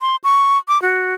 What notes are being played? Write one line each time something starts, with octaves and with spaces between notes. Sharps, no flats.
C6
C#6
D6
F#4